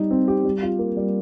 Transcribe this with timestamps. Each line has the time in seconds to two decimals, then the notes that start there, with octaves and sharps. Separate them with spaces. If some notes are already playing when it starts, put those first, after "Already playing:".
Already playing: G3 D#4
0.11 C4
0.28 G4
0.44 G3
0.62 F4
0.79 A#3
0.97 G3